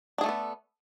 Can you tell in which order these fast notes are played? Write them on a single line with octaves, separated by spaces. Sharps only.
D4 G#4 A3 A4 B3